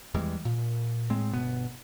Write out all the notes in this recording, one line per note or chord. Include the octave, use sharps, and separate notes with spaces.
E2 E3 G3 G#3
A#2
A2 G#3 C4
G1 B2 B3